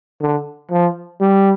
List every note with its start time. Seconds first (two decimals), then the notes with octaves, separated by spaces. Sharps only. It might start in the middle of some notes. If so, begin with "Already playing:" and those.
0.22 D3
0.71 F3
1.21 G3